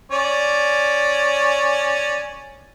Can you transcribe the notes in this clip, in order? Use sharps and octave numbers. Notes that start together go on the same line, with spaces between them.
C#4 D5